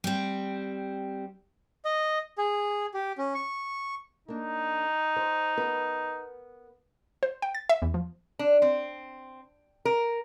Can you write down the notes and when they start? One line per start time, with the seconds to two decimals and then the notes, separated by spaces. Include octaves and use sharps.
0.04 G3 C4
1.85 D#5
2.38 G#4
2.94 G4
3.18 C#4
3.35 C#6
4.28 A#3 D4 D#4
5.16 C5
5.57 B3 A#4 B4
7.23 C5
7.42 G5
7.55 A6
7.69 E5
7.82 E2
7.94 F3
8.39 D4
8.62 C4
9.85 A#4